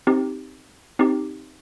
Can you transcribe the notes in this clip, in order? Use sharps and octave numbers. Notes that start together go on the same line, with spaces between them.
C4 D#4 G4
C4 D#4 G4